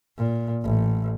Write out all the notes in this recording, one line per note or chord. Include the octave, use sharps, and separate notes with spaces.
A#2
A1